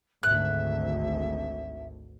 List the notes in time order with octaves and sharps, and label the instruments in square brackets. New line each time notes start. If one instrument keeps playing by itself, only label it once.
[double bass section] G#1 D2 [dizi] E5 [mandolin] F#6